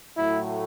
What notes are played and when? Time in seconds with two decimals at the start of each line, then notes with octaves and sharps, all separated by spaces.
0.16 A2 F#3 A3 E4